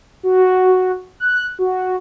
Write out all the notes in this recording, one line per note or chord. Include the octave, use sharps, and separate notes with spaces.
F#4
F#6
F#4